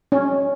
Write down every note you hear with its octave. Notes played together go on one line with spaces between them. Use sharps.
C#4